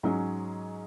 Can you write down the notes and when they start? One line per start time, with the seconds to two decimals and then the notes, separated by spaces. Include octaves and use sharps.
0.03 G#2 F#3 C#4 G#4